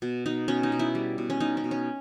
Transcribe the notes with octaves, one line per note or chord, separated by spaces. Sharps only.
B2
B2 D#4
B2 C#4
D#4
B2
E4
G3
B2
C#4
B2 D#4
C#4
B2
C#4